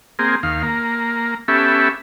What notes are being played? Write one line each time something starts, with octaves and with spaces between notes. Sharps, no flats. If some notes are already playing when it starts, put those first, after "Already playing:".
A#3 C4 G#4
D#2 F5
A#3
B3 C#4 G4 A4 E5